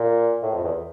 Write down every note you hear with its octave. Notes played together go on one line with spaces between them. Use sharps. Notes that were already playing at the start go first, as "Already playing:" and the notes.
Already playing: A#2
A2
F2
E2